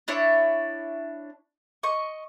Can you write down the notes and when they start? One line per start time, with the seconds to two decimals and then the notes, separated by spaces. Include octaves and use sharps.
0.08 D4 E4 C#5
1.83 D#5 C#6